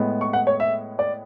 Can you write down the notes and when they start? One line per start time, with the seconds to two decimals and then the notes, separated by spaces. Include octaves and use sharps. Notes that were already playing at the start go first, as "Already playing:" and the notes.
Already playing: A2 G#3 B3
0.21 C#6
0.33 F#5
0.47 C#5
0.60 E5
0.99 D5